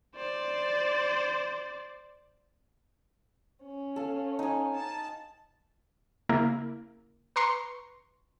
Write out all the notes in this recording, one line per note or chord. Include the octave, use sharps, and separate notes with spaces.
C5 D5
C#4
A4 F5
D#4 G#5
A5
C#3 A#3 E4
B4 A#5 C6 C#6